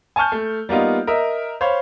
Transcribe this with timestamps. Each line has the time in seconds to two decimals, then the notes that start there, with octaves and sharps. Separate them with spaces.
0.16 G#5 A5 C#6 F6 G6
0.32 A3
0.69 G3 A#3 B3 D#4 F4
1.07 A#4 D#5 E5
1.61 C5 C#5 F5 B5